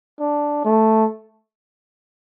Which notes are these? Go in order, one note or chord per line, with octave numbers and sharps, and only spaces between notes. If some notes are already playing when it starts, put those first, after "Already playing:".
D4
A3